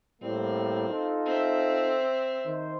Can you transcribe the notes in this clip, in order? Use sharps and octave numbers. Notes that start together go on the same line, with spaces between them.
A2 G3 A#3 C4
D#4 F4 A4
C4 E5
D#3 C5